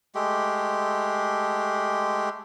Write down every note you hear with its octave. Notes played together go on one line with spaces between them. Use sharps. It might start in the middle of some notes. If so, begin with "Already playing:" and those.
G#3 A3 G4